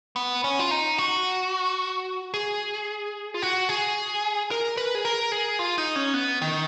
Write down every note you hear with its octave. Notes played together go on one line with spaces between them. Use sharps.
B3
C#4
F4
D#4
F#4
G#4
F4
F#4
G#4
A#4
B4
G#4
A#4
G#4
F4
D#4
C#4
B3
D#3